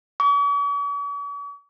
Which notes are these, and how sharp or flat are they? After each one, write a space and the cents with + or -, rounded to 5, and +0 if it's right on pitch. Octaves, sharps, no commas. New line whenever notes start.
C#6 +45